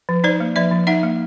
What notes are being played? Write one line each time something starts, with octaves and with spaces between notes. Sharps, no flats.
F3
D#4 C5 D5
A#3
F3 D5 E5
F3
D#4 E5 F#5
A#3